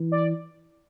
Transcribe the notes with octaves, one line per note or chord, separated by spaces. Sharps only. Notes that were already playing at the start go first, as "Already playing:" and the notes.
Already playing: E3
D5